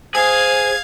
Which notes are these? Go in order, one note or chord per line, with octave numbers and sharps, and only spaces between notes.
G#4 C5 F5 G#6